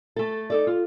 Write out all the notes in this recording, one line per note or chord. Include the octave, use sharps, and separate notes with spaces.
A3 A4
D#4 A4 D5
F4